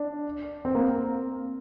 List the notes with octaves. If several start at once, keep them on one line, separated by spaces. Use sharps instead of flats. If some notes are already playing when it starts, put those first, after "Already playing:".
Already playing: D4
C4
A#3